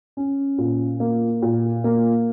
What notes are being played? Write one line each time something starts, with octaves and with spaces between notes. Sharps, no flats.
C#4
A#2
A#3
A#2
A#3